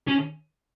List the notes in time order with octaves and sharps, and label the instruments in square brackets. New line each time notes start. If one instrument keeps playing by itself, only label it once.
[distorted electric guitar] C#4